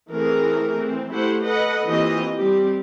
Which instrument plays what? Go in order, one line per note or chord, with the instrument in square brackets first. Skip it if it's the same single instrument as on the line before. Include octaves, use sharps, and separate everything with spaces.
[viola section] E3 A3 C4 G#4 A#4
E3 C4
A3 E4 G4 C5 F#5
A4 B4 D#5 F#5
E3 A#3 C4 F4 G4 D#5
G3 C4 G4